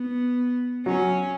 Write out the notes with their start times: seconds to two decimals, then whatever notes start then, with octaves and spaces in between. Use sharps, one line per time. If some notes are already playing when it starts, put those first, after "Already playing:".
Already playing: B3
0.86 F#3 C#4